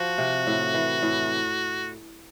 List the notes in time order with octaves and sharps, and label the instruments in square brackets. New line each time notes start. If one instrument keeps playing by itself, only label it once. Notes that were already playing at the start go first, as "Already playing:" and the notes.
Already playing: [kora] F3 [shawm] F#4
[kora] C3
A2
E3
A2